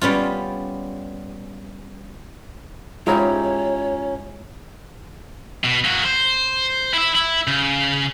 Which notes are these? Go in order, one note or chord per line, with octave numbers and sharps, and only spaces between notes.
G3 B3 C#4 F4
G#2 C#4 E4 F4 G4 C#5 A#5
B2
A#3 F#4
C5
E4 E5
E4
C#3